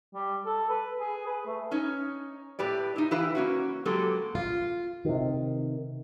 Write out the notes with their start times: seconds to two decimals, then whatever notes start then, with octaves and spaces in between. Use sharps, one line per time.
0.14 G3
0.46 A4
0.70 B4
1.00 G#4
1.27 B4
1.47 A3
1.71 C#4 D#4 C#5
2.59 A2 G4 B4 D5
2.96 D#4 E4
3.11 E3 E4 G4 B4 F5
3.35 A#3 C#4 F#4
3.85 F#3 G#3 A#3 G4 A4 B4
4.35 F4
5.05 C3 D#3